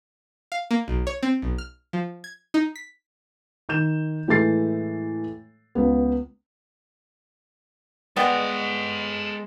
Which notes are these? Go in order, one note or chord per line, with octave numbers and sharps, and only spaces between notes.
F5
A#3
B1
C#5
C4
B1
F6
F3
G#6
D#4
B6
D#3 G6 E7
A2 E3 G#3 A4 A6 C7
C#2 B3
G#3 B3 G4 A4 D5 D#5 F#5 G5